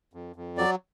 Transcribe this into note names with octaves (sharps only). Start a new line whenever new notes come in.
F2
F2
F#3 D5